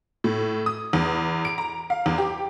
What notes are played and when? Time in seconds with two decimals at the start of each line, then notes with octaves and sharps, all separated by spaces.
0.24 A2
0.66 D#6
0.93 E2
1.45 D7
1.58 A#5
1.90 F5
2.06 E2
2.18 G4